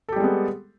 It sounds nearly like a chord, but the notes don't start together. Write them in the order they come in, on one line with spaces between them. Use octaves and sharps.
A4 G4 G3 G#3 B3